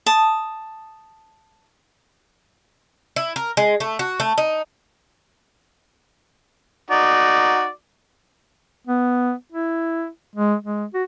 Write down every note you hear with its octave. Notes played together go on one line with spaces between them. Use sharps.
A5 D#6
E4
A#4
G#3
A3
F#4
A3
D#4
D#4 F#4 D5
B3
E4
G#3
G#3
F#4